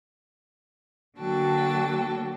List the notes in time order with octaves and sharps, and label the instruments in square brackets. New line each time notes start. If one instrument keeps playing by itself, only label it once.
[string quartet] D3 F#3 A#3 F#4 G5 A5